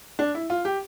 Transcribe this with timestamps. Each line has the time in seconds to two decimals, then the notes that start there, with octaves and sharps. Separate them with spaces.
0.19 D4
0.35 E4
0.50 F4
0.65 G4